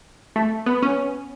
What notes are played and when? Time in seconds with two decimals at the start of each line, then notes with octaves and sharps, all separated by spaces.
0.36 A3
0.66 B3
0.83 C#4